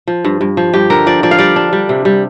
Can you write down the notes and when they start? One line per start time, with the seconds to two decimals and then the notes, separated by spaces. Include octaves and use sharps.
0.07 F3
0.25 G2
0.41 G2
0.57 F3
0.74 G2 G4
0.90 D3 A#4
1.07 F3 D5
1.23 F3 D5
1.31 F5
1.38 G3 D5
1.56 D4
1.73 G3
1.89 C3
2.05 G3